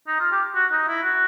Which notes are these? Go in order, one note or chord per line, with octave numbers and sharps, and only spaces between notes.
D#4
F4
G4
F#4
D#4
E4
F#4